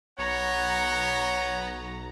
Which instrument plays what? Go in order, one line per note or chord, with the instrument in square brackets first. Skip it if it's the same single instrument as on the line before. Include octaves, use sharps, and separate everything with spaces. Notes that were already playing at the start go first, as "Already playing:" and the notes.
[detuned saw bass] B1 [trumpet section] B3 F#5 [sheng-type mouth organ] C#5 [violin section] A#5